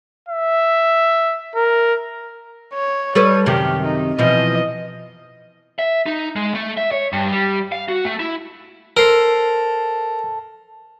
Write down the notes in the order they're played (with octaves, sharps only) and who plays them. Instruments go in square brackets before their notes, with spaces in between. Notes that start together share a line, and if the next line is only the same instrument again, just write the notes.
[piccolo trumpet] E5
A#4
[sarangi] C#5
[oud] G3 A4 B4 [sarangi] C#5
[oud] F#2 C3 D#3 [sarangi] G4
[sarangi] D#4
[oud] B2 E3 F3 [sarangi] D#5
[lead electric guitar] E5
D#4
G#3
A3
E5
C#5
G2
G3
F5
F#4
A3
E4
[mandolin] A4 C5 [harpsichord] A#4